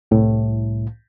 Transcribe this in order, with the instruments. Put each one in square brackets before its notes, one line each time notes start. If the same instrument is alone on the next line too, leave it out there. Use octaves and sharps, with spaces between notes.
[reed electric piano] C2 A2